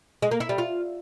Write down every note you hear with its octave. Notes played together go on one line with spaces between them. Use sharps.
G#3
A#3
E4
G3
F4